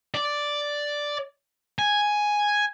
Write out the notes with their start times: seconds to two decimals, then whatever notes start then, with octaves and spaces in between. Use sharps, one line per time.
0.15 D5
1.79 G#5